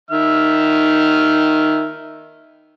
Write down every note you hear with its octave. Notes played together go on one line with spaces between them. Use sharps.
D#3 E5 F6